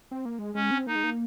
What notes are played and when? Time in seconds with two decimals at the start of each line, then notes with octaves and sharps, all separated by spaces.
0.11 C4
0.25 A#3
0.39 G#3
0.55 G#3 C#4
0.71 C4
0.87 A#3 D#4
0.95 G#3
1.04 A#3